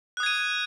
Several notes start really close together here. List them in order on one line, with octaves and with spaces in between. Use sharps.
F#6 D#6 G#6 D#7